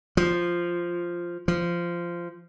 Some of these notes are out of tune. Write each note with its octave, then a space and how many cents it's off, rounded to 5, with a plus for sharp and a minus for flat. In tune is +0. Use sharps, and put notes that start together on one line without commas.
F3 -5
F3 -15